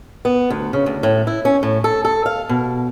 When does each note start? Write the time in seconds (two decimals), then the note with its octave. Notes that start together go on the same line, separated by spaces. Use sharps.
0.25 B3
0.50 D2
0.73 C#3
0.86 D2
1.03 A2
1.27 E4
1.45 C#4
1.63 A2
1.84 A4
2.05 A4
2.26 F5
2.49 B2